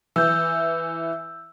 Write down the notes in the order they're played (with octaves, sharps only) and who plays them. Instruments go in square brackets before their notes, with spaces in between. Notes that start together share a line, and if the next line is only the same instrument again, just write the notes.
[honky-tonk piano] E3 [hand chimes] E6 G6